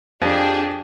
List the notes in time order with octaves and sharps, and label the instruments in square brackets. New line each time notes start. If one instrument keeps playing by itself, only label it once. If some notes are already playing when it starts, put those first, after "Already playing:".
[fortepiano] F2 [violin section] D4 G#4 [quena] G4